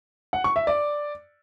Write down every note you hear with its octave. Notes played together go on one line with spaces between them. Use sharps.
F#5
C#6
E5
D5